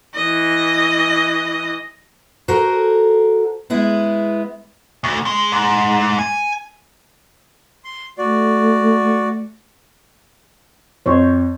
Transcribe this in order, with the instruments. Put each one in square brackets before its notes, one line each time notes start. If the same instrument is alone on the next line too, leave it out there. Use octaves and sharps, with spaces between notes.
[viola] E3 D#5
[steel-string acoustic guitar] F#4 A4 A#4 C5
G#3 B3 E4
[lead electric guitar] D2
G#3
G#2
G#5
[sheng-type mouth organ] C6
[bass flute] A3 [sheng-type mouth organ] F#4 D5
[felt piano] F2 [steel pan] C5 C#5